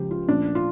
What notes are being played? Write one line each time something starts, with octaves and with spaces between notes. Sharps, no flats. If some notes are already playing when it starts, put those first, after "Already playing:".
Already playing: C#2 C#3 F3 G4
F4
A#2 F3 A3 D4
F4